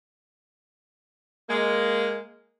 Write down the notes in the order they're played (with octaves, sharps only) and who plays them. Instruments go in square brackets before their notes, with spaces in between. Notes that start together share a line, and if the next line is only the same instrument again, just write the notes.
[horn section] G#3 A#3